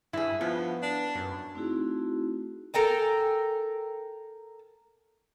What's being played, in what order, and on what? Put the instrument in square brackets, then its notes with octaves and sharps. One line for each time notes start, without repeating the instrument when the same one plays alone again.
[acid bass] G2 [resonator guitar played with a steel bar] E4 G#4
[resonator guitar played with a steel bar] G2 [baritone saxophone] F3 [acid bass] B3
[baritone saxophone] D4
[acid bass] F#2
[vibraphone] A3 C4 D#4 E4 F#4 G#4
[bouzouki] A4 A#4 G5 G#5